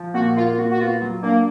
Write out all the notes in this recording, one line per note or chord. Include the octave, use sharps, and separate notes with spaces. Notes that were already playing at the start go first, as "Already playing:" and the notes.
Already playing: F3
A#2 F#4
A#3 F4
A#2 F#4
F#4
B3 F4
F#3
A#3 D4